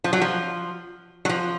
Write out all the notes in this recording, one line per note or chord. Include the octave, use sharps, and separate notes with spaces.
F3
F#3
F3
F#3
F3